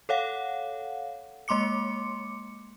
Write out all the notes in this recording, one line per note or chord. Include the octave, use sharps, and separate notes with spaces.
A4 C#5 F5 F#5
G#3 A#3 C6 D6 C#7